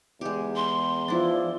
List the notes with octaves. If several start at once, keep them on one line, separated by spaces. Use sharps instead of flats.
E2 G#3 G4
C6
F3 D4 E4